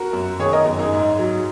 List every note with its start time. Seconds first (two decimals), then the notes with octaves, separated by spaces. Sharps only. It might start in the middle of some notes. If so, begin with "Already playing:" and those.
Already playing: F#4 A#4
0.13 F#2
0.39 D#3 G#4 C#5
0.53 A#4 D#5
0.66 F#2
0.79 D#4 G#4
0.93 G#2
1.19 F#3